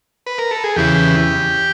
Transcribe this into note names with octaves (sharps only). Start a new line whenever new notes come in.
B4
A#4
A4
G#4
E2 C#3 E3 G4